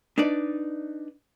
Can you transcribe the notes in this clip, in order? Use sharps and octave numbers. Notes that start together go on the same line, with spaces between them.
D4 D#4 B4 D5